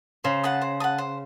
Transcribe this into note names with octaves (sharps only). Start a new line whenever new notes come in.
C#3 C5
F#5 A5 D#6
C5
F#5 A5 D#6
C5